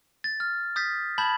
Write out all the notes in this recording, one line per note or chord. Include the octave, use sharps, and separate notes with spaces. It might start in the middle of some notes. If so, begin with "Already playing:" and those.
A6
F6
D#6 G6 A6 B6
A5 B5 G6 G#6 F#7